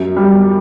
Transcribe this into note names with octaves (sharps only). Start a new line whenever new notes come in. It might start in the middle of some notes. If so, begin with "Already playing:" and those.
Already playing: F#2
G3